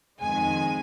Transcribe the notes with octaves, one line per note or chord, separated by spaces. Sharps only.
F2 D#3 G#3 G#5